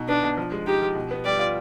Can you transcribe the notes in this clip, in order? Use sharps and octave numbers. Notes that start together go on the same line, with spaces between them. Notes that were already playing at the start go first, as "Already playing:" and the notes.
Already playing: B2 D#4
B3 D4
B2
F3
G#3
D#4 G4
F3
B2
B3
G3 D5
F4